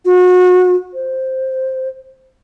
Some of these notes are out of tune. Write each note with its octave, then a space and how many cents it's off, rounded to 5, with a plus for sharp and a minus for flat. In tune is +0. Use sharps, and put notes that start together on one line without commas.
F#4 -30
C5 +5